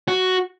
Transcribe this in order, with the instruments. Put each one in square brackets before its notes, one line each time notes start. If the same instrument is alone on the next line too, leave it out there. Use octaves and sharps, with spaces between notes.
[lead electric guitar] F#4